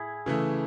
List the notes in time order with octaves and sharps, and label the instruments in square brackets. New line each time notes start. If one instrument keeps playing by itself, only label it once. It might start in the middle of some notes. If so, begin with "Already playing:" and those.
Already playing: [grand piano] A2 [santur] E4 G#4
[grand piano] C#3 E3 A3